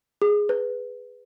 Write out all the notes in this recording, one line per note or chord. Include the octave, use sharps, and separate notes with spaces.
G#4
B4